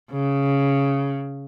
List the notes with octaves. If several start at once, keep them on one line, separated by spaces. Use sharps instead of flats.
C#3